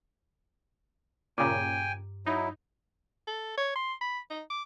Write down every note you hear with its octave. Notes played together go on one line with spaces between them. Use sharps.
G2 A#2 C#3 G5 G#5 A#5 D6
F#3 D#4 E4
A4
C#5
C6
B5
D#4
D6